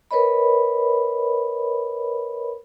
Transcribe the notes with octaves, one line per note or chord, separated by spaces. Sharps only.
A#4 B4 C#5 D#5 B5